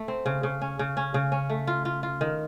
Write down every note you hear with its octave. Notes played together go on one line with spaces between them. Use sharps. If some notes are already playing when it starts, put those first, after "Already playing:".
Already playing: A3
C4
C#3
C#3
C#4
C#3
C#4
C#3
C#4
A3
F4
F4
F4
D#3